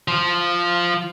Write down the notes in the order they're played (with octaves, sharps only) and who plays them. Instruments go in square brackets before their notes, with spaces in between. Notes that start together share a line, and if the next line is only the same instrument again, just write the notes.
[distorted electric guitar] F3